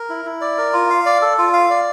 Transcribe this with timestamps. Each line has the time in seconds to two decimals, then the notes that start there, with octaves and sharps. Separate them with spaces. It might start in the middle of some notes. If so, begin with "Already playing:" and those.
Already playing: A#4
0.09 E4
0.25 E4
0.41 D5
0.58 A#4
0.73 F4
0.90 F5
1.06 D5
1.22 A4
1.38 F4
1.53 F5
1.70 D5